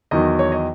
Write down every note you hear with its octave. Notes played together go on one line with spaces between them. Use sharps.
E2 D#3 F#3 D#5
C#5
D#5